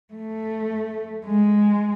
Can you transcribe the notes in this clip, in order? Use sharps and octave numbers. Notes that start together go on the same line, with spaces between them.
A3
G#3